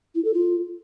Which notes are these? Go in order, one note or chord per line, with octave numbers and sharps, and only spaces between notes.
E4
A4
F4